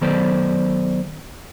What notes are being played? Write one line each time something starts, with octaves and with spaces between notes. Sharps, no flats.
D#3 F#3 B3 A4 C5 D5